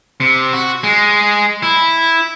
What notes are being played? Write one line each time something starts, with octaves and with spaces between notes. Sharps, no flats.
C3
F#4
G#3
E4